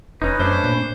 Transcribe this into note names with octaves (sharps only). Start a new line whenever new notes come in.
E1 C#4 D#4 B4
F#2 A3 C#4 D4 C5
A#2